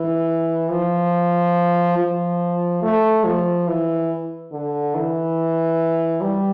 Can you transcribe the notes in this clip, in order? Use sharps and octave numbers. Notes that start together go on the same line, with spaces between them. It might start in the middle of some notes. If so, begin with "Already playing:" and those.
Already playing: E3
F3
F3
A3
F3
E3
D3
E3
G3